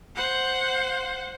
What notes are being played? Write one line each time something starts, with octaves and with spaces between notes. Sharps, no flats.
C5 F#5